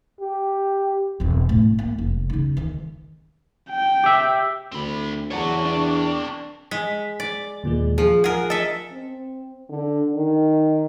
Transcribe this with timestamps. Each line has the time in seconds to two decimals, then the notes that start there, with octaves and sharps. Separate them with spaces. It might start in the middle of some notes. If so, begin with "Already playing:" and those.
0.21 G4
1.20 E1 C4
1.49 A2
1.79 A#3
1.98 F1
2.30 C#3 D#4
2.57 D#3 G#3
3.71 G5
4.04 G4 E5
4.72 D2 C4 B5
5.31 E2 C4 C#5 D5 F#5 A5 C#6
5.65 D4
6.71 G#3 B6
7.20 D5
7.63 D#2 A#2 G#3
7.98 F3 G#4
8.24 G#4 A#4 F#5
8.50 A4 D#5 E5 A5 D#6
8.92 C4
9.69 D3
10.15 D#3